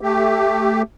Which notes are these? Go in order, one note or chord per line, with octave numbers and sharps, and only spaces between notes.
A3 G4